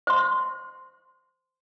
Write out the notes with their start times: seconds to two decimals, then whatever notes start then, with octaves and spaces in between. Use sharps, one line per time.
0.07 C5 C6